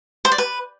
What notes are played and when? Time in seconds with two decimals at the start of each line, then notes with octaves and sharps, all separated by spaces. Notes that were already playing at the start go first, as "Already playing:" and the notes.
0.25 C5
0.32 D5
0.38 B4